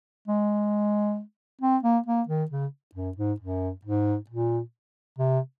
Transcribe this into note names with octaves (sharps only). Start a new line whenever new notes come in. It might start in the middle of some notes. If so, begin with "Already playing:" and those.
G#3
C4
A#3
A#3
D#3
C#3
F#2
G#2
F#2
G#2
A#2
C3